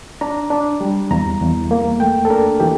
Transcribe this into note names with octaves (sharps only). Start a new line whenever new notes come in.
D4 A#5
D4
G3
E2 A#5
E2
A#3
A3 G5
A4
D4 A#4
E3 G4